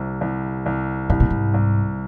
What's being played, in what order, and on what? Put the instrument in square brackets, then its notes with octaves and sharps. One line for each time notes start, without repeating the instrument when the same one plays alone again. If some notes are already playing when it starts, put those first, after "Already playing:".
Already playing: [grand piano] C2 C3
C2
C2
[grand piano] C2 [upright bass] G#2
[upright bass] A#2
G#2
[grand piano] C2